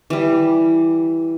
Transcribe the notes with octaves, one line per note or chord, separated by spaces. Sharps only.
E3 G3